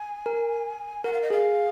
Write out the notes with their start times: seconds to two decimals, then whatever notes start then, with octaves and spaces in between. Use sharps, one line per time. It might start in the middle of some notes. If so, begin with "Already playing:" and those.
Already playing: G#5
0.26 A#4
1.04 A#4 F#5
1.13 F5
1.22 D#5
1.30 G#4 F5